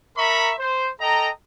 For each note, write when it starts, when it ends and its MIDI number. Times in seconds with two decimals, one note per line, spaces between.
0.18 0.53 70
0.18 0.53 76
0.18 0.53 82
0.18 0.53 83
0.18 0.53 85
0.60 0.90 72
1.01 1.29 69
1.01 1.29 75
1.01 1.29 79
1.01 1.29 82